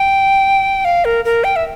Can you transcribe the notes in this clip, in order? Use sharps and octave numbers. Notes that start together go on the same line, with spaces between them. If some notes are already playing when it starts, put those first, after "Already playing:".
Already playing: G5
F5
A#4
A#4
G5
E5